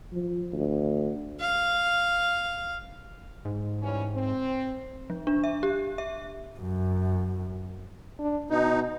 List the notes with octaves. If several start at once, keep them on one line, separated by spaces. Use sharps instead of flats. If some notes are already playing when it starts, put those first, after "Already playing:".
F3
D2
F5
G#2
E3 G3 C#4
C4
F3
D4
E5
G4
E5
F#2
D4
B2 D#4